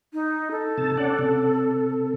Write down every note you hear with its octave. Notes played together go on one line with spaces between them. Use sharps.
D#4
A4
C3 A5
C#4 D5 F#5
C3